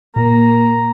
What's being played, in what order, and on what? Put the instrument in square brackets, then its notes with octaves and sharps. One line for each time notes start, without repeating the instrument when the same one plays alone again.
[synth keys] A#2 [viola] A#3 [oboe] A#5